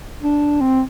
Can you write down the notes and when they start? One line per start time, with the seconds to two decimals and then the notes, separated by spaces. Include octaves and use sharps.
0.22 D4
0.61 C4